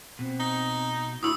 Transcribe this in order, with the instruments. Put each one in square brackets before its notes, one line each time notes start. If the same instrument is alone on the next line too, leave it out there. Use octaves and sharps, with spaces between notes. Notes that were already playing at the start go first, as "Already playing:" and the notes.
[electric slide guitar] B2 [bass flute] C4
[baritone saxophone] D#4
[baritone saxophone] D2 [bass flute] E4 [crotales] D#6 E6